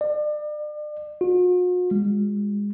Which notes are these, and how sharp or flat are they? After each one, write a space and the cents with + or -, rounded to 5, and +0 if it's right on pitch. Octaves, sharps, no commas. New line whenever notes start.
D5 +35
F#4 -45
G#3 -25